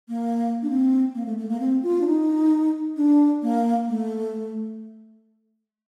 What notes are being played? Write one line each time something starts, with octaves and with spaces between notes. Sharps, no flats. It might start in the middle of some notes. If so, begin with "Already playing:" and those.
A#3
D4
C4
A#3
A3
A3
A#3
C4
F4
D4
D#4
D4
A#3
A3